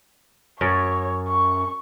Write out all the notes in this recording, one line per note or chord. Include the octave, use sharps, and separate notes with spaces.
F#2 C#5
C#6